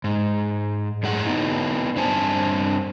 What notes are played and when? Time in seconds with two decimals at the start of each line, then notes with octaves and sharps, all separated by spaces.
0.04 G#2
1.03 F#2 A2 G#4 F#5
1.25 B3 D#4 E4
1.96 G2 C4 D4 C5 G#5 A5